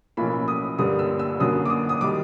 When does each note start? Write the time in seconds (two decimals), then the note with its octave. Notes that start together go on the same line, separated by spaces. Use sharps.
0.17 B1 A2 F3 A#3 C#4 B5
0.48 D#6
0.78 G2 D3 G3 A#3 D#6
0.99 E6
1.19 E6
1.40 F#2 D3 F#3 A#3 D#6
1.65 D6
1.70 D#6
1.89 D#6
2.01 D#3 G3 D6